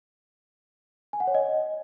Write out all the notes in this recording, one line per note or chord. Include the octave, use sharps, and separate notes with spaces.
G#5
F#5
C#5
D#5